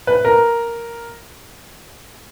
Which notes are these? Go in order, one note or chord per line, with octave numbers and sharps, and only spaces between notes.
B4
A#4